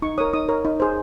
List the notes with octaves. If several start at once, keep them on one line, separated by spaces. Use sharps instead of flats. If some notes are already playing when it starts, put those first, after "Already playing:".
D#4 C#6
A#4 C#5 D#6
D#4 D#6
A#4 C#5
D#4
G#4 C5